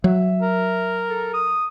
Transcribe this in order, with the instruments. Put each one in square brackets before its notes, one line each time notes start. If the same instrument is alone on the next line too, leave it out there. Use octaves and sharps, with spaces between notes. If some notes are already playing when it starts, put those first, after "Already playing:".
[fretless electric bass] F#3 [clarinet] E5
[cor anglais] A#4
[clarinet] A4
D#6